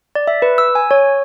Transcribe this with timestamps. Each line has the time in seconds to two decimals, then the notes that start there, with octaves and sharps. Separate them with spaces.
0.15 D5
0.27 E5
0.42 B4
0.58 E6
0.75 G#5
0.91 C#5